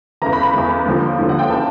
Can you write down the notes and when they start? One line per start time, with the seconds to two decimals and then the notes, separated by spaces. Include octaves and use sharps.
0.22 E2 C#3 E3 A#5
0.33 B5
0.43 B5
0.54 E2 C#3 E3 B5
0.85 D#2 D3 F3
1.18 D#2 D3 F3
1.29 F#5
1.39 G5
1.49 C#3 E3 A5